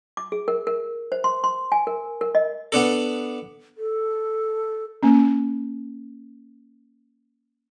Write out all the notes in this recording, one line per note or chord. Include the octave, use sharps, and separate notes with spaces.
D6
G#4
A#4
A#4
C5
C6
C6
G#5
A#4
A#4
D#5
B3 D4 A4
A4
A#3 C#4